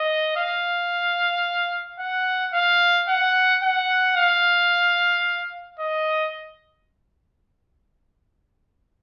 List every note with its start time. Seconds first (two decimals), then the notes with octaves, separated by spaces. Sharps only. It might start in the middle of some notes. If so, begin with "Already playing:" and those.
Already playing: D#5
0.37 F5
1.99 F#5
2.54 F5
3.09 F#5
3.63 F#5
4.16 F5
5.79 D#5